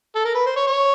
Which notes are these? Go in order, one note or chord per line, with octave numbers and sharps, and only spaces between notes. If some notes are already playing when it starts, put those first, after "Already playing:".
A4
A#4
B4
C5
C#5
C#5